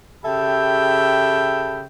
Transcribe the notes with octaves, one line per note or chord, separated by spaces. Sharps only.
C#3 G4 A4 E5 G5 B5